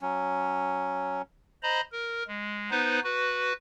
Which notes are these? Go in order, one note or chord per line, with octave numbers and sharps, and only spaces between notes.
F#3 C#4
C5 D#5 A#5 B5
A#4
G#3
B3 D#4 B4 C5
F#4 B4